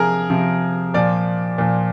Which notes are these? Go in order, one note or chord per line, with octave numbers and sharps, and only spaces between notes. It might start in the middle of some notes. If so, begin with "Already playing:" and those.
Already playing: C3 F3 G#4 A#4
C3 F3
A#2 F3 D5
A#2 F3